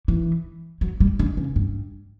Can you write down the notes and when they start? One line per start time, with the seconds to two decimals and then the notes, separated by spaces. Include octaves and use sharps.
0.08 E3
0.81 F#3
1.00 G3
1.19 D3
1.37 C#3
1.56 G2